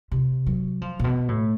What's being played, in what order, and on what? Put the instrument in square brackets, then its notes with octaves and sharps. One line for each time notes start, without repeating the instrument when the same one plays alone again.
[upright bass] C3
F#3
F3
A#2
B2
A2